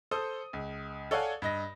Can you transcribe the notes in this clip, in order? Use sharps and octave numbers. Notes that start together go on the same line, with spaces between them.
A4 C5 D#6
C#2
A4 C#5 D5 F5 F#5 G#5
G2 D#5 A#6